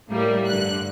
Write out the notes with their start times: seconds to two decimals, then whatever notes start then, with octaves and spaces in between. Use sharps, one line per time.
0.10 A2 G3 A#3
0.47 G2 D3 F#6